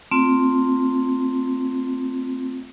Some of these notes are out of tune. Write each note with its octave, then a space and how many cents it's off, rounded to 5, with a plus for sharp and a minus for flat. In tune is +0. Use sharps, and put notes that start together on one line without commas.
A3 +30 C4 +0 F4 +0